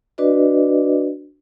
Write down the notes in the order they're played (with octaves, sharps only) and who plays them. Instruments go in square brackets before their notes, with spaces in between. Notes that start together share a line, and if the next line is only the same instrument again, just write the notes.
[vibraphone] D4 F#4 B4 D5 D#5